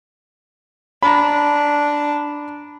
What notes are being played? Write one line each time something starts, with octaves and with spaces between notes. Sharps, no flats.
D4 A#5 B5